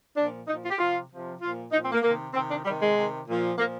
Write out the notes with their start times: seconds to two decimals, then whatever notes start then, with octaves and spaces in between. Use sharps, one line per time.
0.17 A#2 F3 D4
0.48 A#2 F3 D#4
0.64 F4
0.71 G4
0.79 C3 F3 F4
1.10 C3 F3
1.41 A#2 F3 F4
1.72 A#2 F3 D#4
1.83 C4
1.92 A#3
2.03 C3 D#3 A#3
2.34 C3 D#3 C4
2.49 D4
2.65 C3 D#3 G3
2.80 G#3
2.96 C3 D#3
3.27 A#2 F3
3.58 A#2 F3 A#3